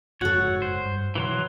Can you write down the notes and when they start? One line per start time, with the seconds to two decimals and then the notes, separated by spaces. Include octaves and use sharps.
0.21 F#1 F2 G#2 F#4 A4 C#5 F#5
0.62 C5
0.86 G2
1.15 B2 D#3 E3 F#3 C6